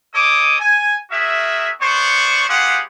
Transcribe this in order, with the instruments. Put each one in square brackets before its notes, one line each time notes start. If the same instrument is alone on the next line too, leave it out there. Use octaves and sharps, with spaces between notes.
[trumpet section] A4 C#5 D#5 D6 D#6
G#5
F#4 G#4 A#4 E5
B3 C5 D5 C#6
G3 F4 G4 G#4 C5 F#5